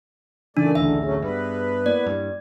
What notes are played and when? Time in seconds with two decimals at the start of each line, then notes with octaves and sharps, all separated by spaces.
0.57 A#2 C#3 E3 A3 D4 D#4 D5
0.75 A1 D2 G#2 D3 E5
1.03 F#3 A3 C#4 G#4
1.22 G2 B3 B4
1.86 A#3 E4 D5
2.06 G2